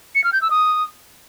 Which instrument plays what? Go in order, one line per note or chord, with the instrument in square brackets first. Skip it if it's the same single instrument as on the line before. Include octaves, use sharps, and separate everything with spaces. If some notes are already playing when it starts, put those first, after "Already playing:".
[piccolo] C#7
F6
G6
E6
D#6